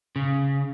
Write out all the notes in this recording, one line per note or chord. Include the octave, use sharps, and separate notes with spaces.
C#3